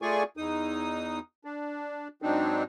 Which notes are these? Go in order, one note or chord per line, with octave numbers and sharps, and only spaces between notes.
A3 F4 G#4 D5 G#5 C#6
E2 D#4 D#6
D4
G#2 F#3 C4 D4 D#4